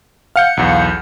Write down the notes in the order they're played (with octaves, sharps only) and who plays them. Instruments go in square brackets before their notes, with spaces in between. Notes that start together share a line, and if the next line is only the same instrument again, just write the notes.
[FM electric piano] F5 F#5 C#7 [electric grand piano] F6 G6
[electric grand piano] B1 E2